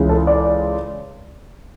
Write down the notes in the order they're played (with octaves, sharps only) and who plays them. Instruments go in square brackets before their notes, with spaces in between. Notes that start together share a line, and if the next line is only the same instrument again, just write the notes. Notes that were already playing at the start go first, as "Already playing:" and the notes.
Already playing: [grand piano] C#2 C#3 E3 G#3
A4
D5